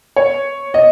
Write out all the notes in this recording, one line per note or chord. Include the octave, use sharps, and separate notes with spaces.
C#5
D#5